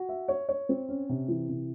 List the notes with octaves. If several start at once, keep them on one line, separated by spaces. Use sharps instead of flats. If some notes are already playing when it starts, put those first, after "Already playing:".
Already playing: F#4
E5
C#5
C#5
C4
C#4
C3
E3
C3